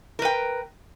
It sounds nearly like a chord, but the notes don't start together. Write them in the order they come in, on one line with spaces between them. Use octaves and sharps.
A#4 B4 G5